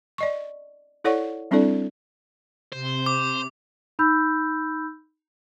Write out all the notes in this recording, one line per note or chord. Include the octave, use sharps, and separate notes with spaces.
D5 D#5 C#6
E4 A4 C#5 D5 F#5 C#6
G3 C4 D4 E4 A4 D5
C3 C5
D6
D#4 B5 E6 G6